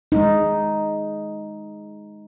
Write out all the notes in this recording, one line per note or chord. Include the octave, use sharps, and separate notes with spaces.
G#3 D#4